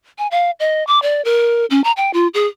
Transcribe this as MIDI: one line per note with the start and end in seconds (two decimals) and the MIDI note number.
0.18 0.27 80
0.31 0.51 77
0.60 0.86 75
0.87 0.99 86
1.02 1.24 74
1.25 1.65 70
1.70 1.83 61
1.84 1.92 82
1.97 2.11 79
2.13 2.28 65
2.34 2.47 68